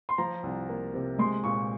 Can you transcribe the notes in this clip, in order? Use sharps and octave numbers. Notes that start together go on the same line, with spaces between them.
C6
F3 A#5
C2
A#3
C3
G#3 C6
A#2 C#6